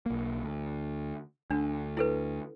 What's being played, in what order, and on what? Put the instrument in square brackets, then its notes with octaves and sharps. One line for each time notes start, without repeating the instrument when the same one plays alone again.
[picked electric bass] B1 A#3
D2
[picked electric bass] D2 [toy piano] D4
[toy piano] E4 A4 B4